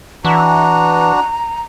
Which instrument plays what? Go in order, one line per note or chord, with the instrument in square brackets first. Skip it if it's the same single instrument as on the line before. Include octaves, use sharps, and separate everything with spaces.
[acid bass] E3 [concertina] D4 F#4 [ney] A#5